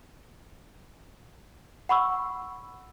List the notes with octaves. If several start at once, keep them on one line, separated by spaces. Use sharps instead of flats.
F#5 B5 C#6 E6